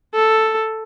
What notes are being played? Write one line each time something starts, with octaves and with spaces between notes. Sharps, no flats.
A4